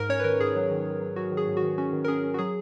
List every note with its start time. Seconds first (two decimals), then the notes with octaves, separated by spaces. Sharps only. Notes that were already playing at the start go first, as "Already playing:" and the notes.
Already playing: G#2 A#4
0.09 C#4 C#5
0.20 B4
0.24 D#3 A#4
0.40 G#2 G#4
0.56 F#3
0.71 D#3
0.86 D#3
1.01 F#3
1.16 F#3 F#4
1.32 D#3
1.37 G#4
1.47 G#2
1.57 F#4
1.62 D#3
1.78 C#4 F#4
1.93 D#3
2.04 A#4
2.08 C#4 G#4
2.24 C#4
2.34 F#4
2.38 F#3 G#4